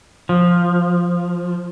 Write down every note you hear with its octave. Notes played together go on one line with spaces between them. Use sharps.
F3